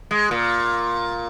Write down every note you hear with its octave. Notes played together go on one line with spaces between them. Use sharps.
G#3
A#2